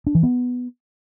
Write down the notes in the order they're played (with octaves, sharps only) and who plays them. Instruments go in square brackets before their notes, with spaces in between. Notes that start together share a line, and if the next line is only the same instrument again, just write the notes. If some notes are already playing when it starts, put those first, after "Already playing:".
[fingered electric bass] D4
E3
B3